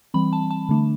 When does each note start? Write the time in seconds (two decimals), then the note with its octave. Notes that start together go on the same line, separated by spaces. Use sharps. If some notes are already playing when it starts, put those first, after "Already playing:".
0.14 E3 G3 C4 B5
0.33 A5
0.51 A5
0.69 D3 A3 D4